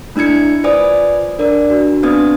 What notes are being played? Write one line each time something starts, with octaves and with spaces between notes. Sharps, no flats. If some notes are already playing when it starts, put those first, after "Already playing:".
A3 D4 E4 G#6 C#7
F4 B4 C5 D5 G#5 D#6
D4 A#4 D5
D4 F#4
B3 C4 D4 B4 D#6 G#6